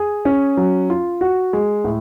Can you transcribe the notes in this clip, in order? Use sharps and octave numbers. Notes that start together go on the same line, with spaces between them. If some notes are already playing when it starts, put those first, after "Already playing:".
Already playing: G#4
C#4
F#3
F4
F#4
G#3
A2